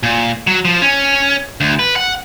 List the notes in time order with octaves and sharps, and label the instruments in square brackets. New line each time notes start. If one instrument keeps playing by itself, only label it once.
[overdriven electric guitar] A#2
F#3
F3
C#4
D2
B4
F#5